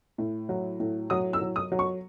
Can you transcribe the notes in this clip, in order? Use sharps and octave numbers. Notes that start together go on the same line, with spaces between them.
A2
F#3
A2
F#3 D#6
E6
F#3
D#6
F#3
C#6